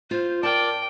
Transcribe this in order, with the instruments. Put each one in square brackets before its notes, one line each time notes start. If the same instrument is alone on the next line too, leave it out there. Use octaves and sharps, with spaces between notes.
[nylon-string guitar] F4 [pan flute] C5
[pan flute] A#4 [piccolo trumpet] D5 [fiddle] G5 [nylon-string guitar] A5